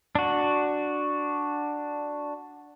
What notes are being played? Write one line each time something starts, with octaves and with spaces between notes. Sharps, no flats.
D4 F#4